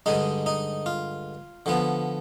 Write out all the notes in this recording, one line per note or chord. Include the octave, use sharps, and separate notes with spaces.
G2 D3 G#3 D#4
D#4
F4
D3 F3 B3